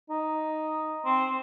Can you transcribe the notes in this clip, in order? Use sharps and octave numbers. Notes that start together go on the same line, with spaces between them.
D#4
C4